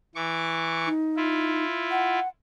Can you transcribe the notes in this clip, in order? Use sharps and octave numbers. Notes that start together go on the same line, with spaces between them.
E3 C#6 D6
D#4
E4 F4
F#5